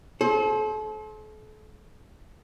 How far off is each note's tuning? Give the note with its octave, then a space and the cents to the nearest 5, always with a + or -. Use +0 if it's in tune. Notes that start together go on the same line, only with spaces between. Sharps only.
A4 -40 C5 +25